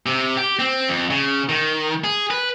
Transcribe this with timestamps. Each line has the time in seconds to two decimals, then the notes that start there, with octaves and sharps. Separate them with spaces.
0.06 C3
0.37 G4
0.59 C4
0.89 F2
1.10 C#3
1.49 D#3
2.04 G#4
2.31 B4